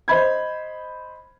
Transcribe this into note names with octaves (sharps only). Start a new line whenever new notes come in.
C5 D#5 B5 G#6